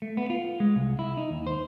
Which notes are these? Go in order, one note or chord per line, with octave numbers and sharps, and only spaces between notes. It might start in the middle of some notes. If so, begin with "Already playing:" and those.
A3
B3
F4
G#3
C2
E4
D#4
D#2
C5